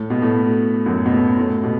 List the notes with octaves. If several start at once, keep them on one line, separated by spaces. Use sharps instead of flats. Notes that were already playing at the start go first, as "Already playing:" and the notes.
Already playing: A2
B2
A2
F#2
B2
A2
A2
B2